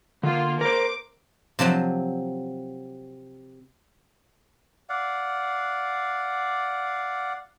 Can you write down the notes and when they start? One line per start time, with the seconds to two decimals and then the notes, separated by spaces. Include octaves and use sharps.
0.23 D3 A#3 F4
0.61 A#4 C5 D6
1.59 C3 F3 F#3 C4
4.89 D5 F5 F#5